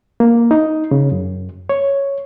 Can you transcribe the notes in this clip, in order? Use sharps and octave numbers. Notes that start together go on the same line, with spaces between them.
A#3
D#4
C#3
F#2
C#5